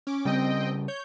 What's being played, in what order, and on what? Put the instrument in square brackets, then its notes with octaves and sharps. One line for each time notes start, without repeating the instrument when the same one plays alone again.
[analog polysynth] C#4 D6
[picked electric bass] C#3 G3 [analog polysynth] C4 D#5 G5
[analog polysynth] C#5 G6